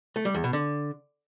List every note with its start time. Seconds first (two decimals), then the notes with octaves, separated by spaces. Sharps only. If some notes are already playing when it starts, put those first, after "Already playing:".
0.16 A3
0.25 G3
0.35 E2
0.44 B2
0.53 D3